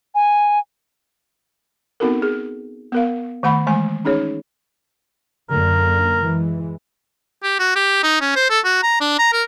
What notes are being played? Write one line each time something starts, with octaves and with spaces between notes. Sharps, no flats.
G#5
B3 C4 D#4 F#4 A4 A#4
G#4
B3 A#4 F5
D#3 A3 F#5 B5
E3 G#3 A3 G#5
C#4 D#4 G#4 C#5
F#2 D3 A#3 A#4
E3 G#3
G4
F#4
G4
D#4
C#4
C5
A4
F#4
A#5
D4
A#5
A#4